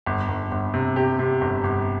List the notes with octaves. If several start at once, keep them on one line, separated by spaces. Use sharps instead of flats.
G1
G1
G1
C3
C3 G4
C3
G1
G1